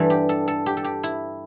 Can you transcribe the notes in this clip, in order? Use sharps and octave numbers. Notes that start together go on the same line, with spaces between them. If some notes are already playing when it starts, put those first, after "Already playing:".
Already playing: G2 E3 G3 A4
G4
A4
A4
G4
A4
G4
E4